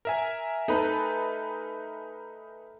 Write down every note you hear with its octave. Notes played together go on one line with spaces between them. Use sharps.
A#4 E5 G#5
D#4 A4 B4